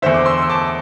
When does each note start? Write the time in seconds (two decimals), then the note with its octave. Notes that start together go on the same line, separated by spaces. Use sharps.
0.02 D3 C5 E5
0.06 E2
0.14 D6
0.26 C6 E6
0.42 E6
0.50 A5 D6